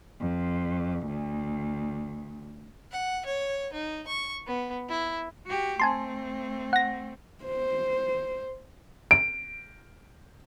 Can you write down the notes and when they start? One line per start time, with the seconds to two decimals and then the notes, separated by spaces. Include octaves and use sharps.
0.20 F2
1.06 D2
2.91 F#5
3.26 C#5
3.73 D#4
4.07 C#6
4.47 B3
4.89 E4
5.47 F#4 G4
5.80 A3 C4 G#5 A5 C6
6.73 F#5 A#6
7.44 C5
9.11 D7